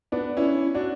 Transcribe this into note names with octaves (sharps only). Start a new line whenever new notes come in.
B3 D4
C#4 E4
D4 F#4